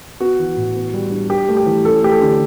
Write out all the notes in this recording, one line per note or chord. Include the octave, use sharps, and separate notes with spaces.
B3 F#4
E3
A2
B3
G3
D4
D4 G4
A3
G4
E3
C#4 A4
A3 G4
A4
D3